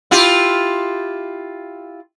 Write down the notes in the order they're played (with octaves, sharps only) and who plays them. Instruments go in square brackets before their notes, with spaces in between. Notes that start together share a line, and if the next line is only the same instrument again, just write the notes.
[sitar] E4 F4 G4